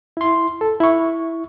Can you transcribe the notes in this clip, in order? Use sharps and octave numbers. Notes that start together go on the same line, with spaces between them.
E4 C6
A4
E4 C#6